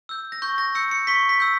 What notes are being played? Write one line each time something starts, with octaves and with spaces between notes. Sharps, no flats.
E6 G6
A#6
C#6 G6
A#6
E6 G6 C#7
C#7
C#6 B6
B6
E6 G6